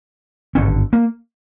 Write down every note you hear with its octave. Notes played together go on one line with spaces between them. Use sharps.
G#1 G2 D3 C#4
A#3